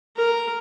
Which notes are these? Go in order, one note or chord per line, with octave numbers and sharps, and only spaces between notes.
A#4